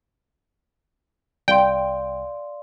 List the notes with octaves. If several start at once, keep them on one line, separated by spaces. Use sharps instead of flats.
C2 D5 F5 G5 C6